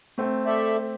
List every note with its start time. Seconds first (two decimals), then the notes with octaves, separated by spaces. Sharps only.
0.18 A3 C4
0.46 A4 D5 E5